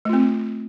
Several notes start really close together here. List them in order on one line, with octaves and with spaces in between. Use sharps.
A3 F4 C4